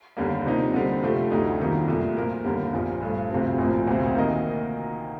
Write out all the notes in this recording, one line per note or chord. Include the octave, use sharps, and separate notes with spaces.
D#2 D3 G3 A#3
C3 F3 A#3 D#4
D3 G3 C4
C3 F3 A3 C4 G4
D2 D3 A3 D#4
F2 D#3 G3 A#3
C2 A#2 A3
A#2 F3 A#3 F4 A#4
D#2 D3 G3 A#3
A#1 A#2 F3
G2 F3 A3
D2 C3 F3 A3 C4
A#1 A2 F3 A#3
D2 C3 F3 C4
D#3 A#3 F4 A#4 D#5